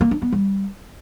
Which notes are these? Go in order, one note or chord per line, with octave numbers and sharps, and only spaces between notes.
A#3
D4
B3
G3